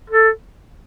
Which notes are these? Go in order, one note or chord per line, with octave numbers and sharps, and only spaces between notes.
A4